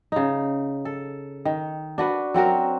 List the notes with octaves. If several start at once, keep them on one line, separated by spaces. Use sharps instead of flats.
C#3 D#4
A4
D#3
D4 F#4 B4
F#3 C4 F#4 A#4